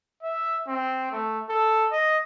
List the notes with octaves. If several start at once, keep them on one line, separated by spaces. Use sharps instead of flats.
E5
C4
A3
A4
D#5